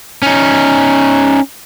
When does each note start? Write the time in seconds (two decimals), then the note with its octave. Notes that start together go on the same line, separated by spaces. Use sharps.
0.22 C#4 D#4